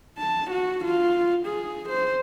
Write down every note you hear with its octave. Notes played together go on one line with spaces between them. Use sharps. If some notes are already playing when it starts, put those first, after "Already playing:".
A5
F#4
F4
G#4
C5